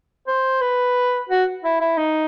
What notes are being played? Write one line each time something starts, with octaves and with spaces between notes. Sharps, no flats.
C5
B4
F#4
E4
E4
D#4